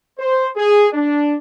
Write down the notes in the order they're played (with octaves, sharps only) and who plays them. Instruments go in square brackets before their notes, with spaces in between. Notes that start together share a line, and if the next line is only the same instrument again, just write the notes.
[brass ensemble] C5
G#4
D4